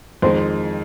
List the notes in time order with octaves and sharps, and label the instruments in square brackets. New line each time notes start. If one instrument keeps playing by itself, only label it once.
[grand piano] F2 D#3 G#3 [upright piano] C5